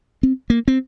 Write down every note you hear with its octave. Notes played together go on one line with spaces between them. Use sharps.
C4
A#3
C4